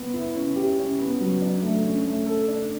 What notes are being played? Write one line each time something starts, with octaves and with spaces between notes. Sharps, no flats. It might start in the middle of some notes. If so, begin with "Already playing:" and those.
Already playing: B3
E4
C#4
G4
C#4
B3
F#3
D4
A3
C#4
A3
A4
D4